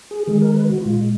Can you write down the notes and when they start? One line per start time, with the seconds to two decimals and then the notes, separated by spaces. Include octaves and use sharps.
0.11 G#4
0.28 D#3 G#3 G#4
0.42 A#4
0.55 B4
0.69 F#4
0.81 A#2 G#3 F4